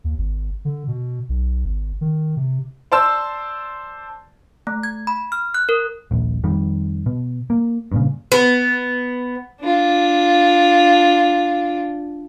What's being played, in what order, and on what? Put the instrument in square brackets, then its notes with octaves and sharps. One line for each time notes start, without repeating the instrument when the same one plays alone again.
[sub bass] D#2
G#1
D3
B2
B1
G#1
D#3
C3
[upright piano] C5 D5 A5 C6 E6
[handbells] A3
G#6
B5
F6
F#6
A#4
[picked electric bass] D#1 A#1
F2 D#3 G3
B2
A#3
G2 A#2 C#3
[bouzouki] B3
[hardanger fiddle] D4 F4